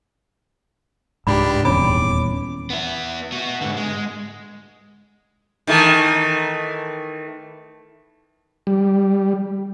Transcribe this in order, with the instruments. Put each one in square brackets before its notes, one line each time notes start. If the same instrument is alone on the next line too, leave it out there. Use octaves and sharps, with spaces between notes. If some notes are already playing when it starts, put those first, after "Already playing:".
[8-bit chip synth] C#2 D4 G4 [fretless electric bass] G#2 [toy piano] B5
[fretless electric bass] D#1 E2 C#4 [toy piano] B5 [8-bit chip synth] D6
[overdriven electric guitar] B3 E4
B3 F#4
G#2 D3
G#3
[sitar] D#3 E3 A3
[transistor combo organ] G3